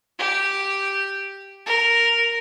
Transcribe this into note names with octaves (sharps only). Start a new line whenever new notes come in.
G4
A#4